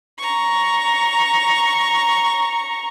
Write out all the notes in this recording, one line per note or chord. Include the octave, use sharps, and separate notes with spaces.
A#5 C#6